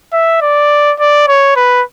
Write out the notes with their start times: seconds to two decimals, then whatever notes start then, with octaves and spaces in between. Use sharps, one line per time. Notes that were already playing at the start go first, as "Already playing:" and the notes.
0.13 E5
0.42 D5
1.00 D5
1.28 C#5
1.56 B4